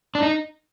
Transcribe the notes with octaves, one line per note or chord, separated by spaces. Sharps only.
D4
D#4